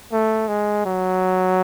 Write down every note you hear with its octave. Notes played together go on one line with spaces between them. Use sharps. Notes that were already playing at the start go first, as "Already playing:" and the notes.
A3
G#3
F#3